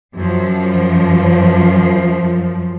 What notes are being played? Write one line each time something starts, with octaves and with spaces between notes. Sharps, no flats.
F#2 F3